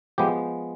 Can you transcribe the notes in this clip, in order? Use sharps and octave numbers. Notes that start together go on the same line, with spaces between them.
F3 G#3 B3 G4